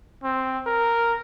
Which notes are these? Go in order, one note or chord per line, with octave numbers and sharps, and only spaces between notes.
C4
A#4